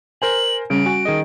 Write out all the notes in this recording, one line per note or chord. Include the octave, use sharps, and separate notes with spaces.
A#4 C5 G#5 F#7
C#3 G3 C#4 D7
F#4 G#5
D#3 G#4 D#5